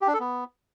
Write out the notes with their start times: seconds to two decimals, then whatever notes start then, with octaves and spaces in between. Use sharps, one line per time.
0.01 G4
0.08 D4
0.14 A4
0.20 B3